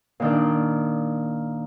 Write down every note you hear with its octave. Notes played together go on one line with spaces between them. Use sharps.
A#2 D#3 D4